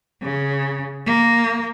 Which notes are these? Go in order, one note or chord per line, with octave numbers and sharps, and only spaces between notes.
C#3
A#3